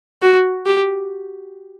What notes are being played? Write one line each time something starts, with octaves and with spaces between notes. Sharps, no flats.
F#4
G4